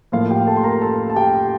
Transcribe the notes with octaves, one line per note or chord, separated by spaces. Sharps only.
A2 F3 A#3 F4 F5
G4 G5
A4 A5
C6
A#4 A#5
A4 A5
A5
G4 G5